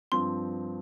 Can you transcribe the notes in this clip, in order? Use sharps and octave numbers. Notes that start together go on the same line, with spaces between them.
G2 F3 C4 C6